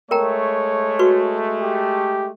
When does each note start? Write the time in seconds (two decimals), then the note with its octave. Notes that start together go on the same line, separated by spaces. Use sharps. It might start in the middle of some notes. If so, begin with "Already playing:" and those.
0.11 G#3 A3 A#4 C#5 G5 A#5
0.99 F#4 B4 C#6
1.62 G4